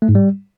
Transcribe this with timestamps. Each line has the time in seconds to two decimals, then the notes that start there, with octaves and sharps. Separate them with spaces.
0.02 A3
0.09 G#2
0.15 G3